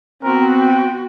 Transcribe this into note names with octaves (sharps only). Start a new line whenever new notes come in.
B3 C4 F#4 A#4
G5